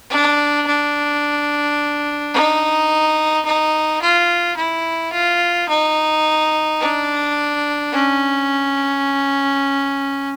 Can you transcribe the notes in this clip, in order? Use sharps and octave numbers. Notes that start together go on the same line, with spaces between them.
D4
D4
D#4
D#4
F4
E4
F4
D#4
D4
C#4